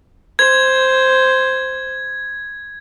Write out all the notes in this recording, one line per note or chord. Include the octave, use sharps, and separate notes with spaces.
C5 G#6